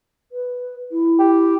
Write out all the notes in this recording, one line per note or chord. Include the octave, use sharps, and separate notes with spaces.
B4
E4
G4